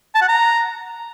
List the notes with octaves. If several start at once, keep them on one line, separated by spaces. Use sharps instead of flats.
A5
F#5
A#5